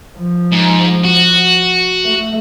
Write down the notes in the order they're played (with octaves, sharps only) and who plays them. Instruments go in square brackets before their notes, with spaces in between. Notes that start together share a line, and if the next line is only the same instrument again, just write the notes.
[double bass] F3
[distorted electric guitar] G#2
F#4
[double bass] A3